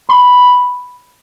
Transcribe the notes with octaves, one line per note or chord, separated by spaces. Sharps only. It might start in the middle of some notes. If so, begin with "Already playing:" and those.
B5